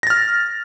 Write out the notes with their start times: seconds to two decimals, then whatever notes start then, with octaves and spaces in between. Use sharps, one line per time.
0.03 A#6
0.07 A6
0.10 F6